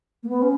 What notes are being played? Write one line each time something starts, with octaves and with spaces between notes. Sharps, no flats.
A#3
B3
C#4